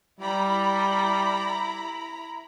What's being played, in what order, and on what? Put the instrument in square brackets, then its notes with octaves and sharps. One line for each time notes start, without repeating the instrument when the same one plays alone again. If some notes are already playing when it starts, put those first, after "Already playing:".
[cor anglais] G3 [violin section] E4 A#5 B5